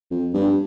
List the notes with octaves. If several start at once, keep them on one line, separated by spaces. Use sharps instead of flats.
F2
G2